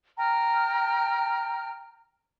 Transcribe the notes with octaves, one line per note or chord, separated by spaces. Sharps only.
G5 A#5 F6